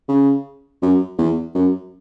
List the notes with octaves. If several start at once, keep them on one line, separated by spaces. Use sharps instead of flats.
C#3
F#2
E2
F#2